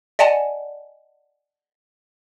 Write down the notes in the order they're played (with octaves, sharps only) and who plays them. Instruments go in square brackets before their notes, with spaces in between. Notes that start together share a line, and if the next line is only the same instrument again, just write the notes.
[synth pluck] D5 D#5 F#5 G#5 A5